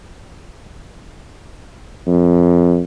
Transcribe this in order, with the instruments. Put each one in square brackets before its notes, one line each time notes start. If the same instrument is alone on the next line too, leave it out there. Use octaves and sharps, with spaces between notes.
[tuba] F2